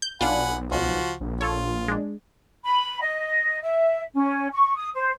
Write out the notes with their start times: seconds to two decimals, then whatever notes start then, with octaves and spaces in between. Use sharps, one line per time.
0.02 G6
0.21 B1 D4 F4 F#5 G#5 B5
0.72 C#2 F3 F#4
1.20 A#1
1.41 F4 A4 C#5
1.88 G#3 D4
2.63 B5
3.00 D#5
3.62 E5
4.14 C#4
4.52 C#6
4.76 D#6
4.94 C5